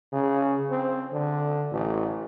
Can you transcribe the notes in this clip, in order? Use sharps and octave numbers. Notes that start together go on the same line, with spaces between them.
C#3
C4
D3
A1